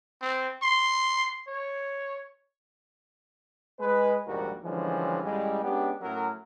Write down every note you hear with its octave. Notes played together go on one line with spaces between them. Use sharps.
C4
C6
C#5
G#3 B4
A#1 D#2 G#2 G3 F#4 A#4
D3 E3 F3 G3 G#3 C#4
A1 G3 G#3
G#3 B3 C#4 D4 G4
A2 F#3 C#4 A#4